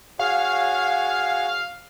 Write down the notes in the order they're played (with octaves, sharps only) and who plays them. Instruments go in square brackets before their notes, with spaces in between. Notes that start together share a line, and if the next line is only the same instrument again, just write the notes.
[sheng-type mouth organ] F#4 G#4 C#5 [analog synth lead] F5